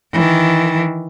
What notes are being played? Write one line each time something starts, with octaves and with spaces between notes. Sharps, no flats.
D#3 E3